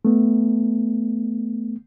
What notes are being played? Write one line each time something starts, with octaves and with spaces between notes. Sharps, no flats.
A3 B3